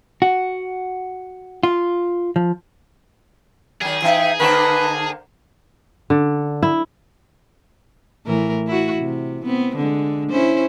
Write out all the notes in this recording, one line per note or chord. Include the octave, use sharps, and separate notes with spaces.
F#4
F4
F3
D#3 F#3 G#4
E3 D#4 E5 G5
D3 A#3 D#4 B4 C5 A5
D3
E4
A2 E3 A#4
E4 F#4
C3
B3 C4
D3 G#3
C#4 E4 C5